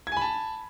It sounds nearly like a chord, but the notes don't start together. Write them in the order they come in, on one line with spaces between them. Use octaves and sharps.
G#6 G#5 B5 A5